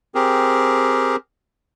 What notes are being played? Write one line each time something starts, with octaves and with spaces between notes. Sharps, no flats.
C4 G4 G#4 A#4